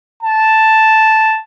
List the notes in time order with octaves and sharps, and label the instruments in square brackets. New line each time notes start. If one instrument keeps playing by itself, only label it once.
[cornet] A5